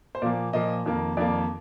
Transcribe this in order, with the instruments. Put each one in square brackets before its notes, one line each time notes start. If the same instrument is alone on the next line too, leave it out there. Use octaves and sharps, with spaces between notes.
[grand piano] C5
A#2 F3 A#3 D5
A#2 F3 A#3 D#5
F2 D#3 A#3
F2 D#3 A#3 D5